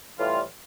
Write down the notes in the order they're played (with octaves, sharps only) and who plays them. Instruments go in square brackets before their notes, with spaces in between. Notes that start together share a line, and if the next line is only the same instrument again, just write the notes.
[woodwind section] A2 E3 G3 F4